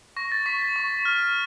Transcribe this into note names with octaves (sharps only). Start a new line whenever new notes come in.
C#6 A#6
A6
C#6 B6
A6
C#6
F6